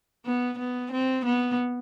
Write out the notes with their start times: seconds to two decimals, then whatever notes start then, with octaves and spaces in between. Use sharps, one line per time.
0.25 B3
0.59 B3
0.92 C4
1.25 B3